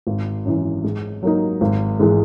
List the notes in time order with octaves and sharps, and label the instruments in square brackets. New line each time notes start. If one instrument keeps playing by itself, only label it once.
[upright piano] G#1
F#2 E3
G#2
F#3 A#3 D#4
G#1
G#2 E3 G#3